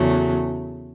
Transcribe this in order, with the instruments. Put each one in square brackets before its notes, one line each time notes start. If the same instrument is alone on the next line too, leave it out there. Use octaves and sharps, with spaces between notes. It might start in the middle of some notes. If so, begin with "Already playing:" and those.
Already playing: [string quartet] E2 C#3 F#3 A3